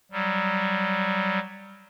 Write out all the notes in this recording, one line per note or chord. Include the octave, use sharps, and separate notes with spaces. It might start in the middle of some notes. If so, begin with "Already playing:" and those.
F#3 G3